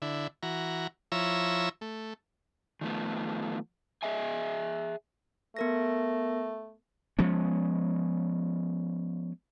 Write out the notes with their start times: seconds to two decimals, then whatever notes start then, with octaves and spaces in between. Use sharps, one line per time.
0.02 D3 E4
0.43 E3 F#4 A#5
1.12 F3 E4 C#5 A#5 E6
1.81 A3
2.81 D#3 F3 A3 B3
4.03 G#4 D#5 E5 G#5
5.57 A3 B3 A#4 A#6
7.19 F3 G#3 B3 C#4